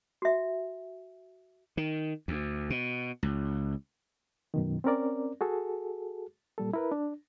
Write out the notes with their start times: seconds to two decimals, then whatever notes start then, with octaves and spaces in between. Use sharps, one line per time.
0.22 F#4 E5
1.77 D#3
2.28 D2
2.70 B2
3.23 C#2
4.54 F#2 B2 D#3
4.84 C4 C#4 A#4 D5
5.41 F#4 G#4 A4
6.58 A#2 G3 A4
6.73 E4 A#4 B4
6.92 D4